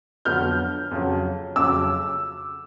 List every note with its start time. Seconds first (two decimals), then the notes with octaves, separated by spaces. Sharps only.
0.25 F2 D3 F#3 B3 F6 G6
0.91 F2 C#3 F#3
1.56 F2 C#3 F#3 D6 E6